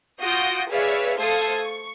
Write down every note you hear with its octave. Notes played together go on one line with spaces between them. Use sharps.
F4 F#4 D#6 G6 A#6 D7
G#4 B4 C#5 D5 E5 F5
A3 A4 C5 F5 D#6 G#6
C#6